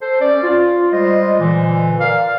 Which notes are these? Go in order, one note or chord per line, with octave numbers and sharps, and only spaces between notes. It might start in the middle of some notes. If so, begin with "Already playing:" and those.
A4 C5
C#4 D5
F4
G3 G#3 F4 C5 D#5
A#2 D3 E3
A#4 D5 F5